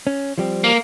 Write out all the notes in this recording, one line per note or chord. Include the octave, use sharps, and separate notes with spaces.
C#4
F3 G3 C4
A#3